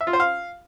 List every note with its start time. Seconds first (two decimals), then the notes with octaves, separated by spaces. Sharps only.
0.01 E5
0.07 F4
0.13 C5
0.20 F5